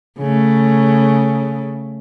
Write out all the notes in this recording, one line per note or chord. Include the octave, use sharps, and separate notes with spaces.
C#3 A3